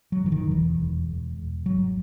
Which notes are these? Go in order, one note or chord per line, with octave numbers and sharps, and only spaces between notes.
F#3
F#1 E3
D#3
E1 E3
E1
E1
E1
G#1 F#3